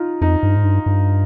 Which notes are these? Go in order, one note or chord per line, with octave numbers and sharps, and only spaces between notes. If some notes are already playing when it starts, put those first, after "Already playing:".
Already playing: D#4 F4
F2 D#4
G2
G#2
G2
G2